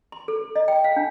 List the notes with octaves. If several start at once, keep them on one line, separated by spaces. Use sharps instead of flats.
C6
A4
D#5
G5
F5
D4